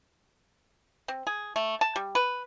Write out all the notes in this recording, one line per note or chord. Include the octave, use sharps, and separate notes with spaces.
C4
G#4
A3
A5
G3
B4